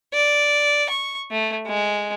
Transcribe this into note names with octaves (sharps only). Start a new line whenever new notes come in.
D5
C#6
A3
G#3